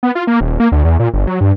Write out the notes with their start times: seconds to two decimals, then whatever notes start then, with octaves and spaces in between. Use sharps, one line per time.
0.03 B3
0.15 F4
0.27 A#3
0.41 D#1
0.60 A#3
0.72 D2
0.85 E2
0.99 A#2
1.13 G1
1.27 F#3
1.41 G2